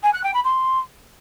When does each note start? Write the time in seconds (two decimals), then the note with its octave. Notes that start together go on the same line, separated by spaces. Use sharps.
0.03 G#5
0.13 F#6
0.24 G5
0.34 B5
0.44 C6